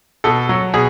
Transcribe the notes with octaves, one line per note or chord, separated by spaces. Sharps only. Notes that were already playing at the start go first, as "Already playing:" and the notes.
B2 A4
F#3
B2 G#4